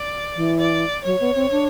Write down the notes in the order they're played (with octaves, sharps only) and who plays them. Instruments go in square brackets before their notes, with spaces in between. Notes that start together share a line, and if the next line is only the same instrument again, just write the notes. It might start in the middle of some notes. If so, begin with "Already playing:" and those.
Already playing: [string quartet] D5
[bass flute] E3
[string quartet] D5
[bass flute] F#3 [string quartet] C#5
[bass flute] B3
C4
D4